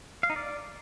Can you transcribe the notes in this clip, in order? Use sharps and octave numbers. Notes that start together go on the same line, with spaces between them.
F5
D#4
D5